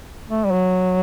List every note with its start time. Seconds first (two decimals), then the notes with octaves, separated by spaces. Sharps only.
0.29 A3
0.44 G3
0.51 F#3